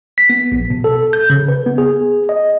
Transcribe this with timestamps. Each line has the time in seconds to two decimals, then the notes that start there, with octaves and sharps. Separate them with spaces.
0.18 B6
0.30 B3
0.52 A#1
0.70 B2
0.84 A4
1.13 G6
1.30 C#3
1.49 B4
1.66 B3
1.78 G#4
2.29 D#5